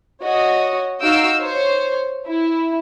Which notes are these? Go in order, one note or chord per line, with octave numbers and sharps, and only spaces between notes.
F#4 C#5 D#5
D#4 F#4 F5 E6 G6 D7
C5 C#5
E4